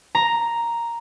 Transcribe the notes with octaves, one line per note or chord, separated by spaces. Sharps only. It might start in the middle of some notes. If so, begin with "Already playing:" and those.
A#5